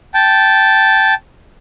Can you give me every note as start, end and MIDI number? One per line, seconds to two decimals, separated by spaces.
0.14 1.14 79
0.14 1.14 81